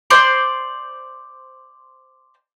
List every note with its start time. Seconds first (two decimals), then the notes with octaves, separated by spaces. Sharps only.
0.10 C5 D5 C6